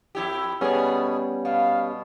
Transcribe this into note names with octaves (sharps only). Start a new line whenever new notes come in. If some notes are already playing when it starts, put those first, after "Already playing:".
F2 E4 G4
B2 G3 A3 B3 C#4 G#4
B2 F5